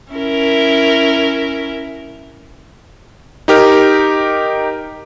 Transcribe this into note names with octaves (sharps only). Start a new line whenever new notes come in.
C#4 E4 A#4
D#4 G4 A#4